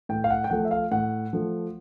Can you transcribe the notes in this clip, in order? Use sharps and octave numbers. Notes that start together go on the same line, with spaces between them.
A2 G5
F5
F#5
G5
F3 A3 F#5
E5
F5
A2 F#5
F3 A3